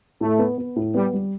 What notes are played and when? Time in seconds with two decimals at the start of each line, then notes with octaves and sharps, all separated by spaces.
0.21 A2 A3
0.39 B3
0.58 B3
0.76 A2
0.94 G3 B3
1.13 G3